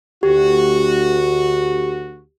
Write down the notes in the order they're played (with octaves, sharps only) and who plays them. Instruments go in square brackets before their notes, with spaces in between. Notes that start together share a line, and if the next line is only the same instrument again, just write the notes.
[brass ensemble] D2 F#4 [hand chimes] G4